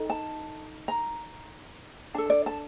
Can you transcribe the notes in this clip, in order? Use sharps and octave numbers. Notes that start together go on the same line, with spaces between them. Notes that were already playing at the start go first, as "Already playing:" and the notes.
Already playing: D#4 A4
A5
A#5
D4 A4 A5
D5
A5